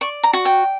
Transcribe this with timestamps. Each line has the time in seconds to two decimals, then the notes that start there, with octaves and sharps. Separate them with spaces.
0.01 D5 C#6
0.23 A#5
0.33 F#4
0.45 G5